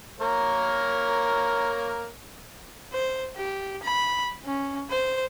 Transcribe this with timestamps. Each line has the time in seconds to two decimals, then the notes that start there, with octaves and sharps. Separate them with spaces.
0.21 A#3 A#4 C#5
2.93 C5
3.36 G4
3.83 B5
4.45 C#4
4.90 C5